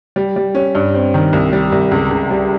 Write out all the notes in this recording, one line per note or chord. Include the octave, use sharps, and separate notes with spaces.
G3
G3
C#4
G2
C4
D#3
C2
G3
C2
C#2
C#2
G3